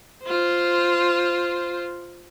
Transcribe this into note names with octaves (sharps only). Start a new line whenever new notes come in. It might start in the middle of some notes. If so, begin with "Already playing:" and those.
F4 C5